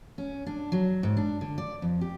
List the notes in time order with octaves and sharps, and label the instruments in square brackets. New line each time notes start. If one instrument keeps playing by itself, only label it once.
[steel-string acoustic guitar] C#4
D4
F#3
G#2
D4
D3
D5
F2
G4